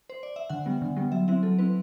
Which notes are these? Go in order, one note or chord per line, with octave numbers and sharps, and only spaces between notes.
C5
D5
E5
D3 F#5
G3 B3
D3
G3 B3
F#3 E5
C4 E4 E5
F#3 A4
C4 E4 B4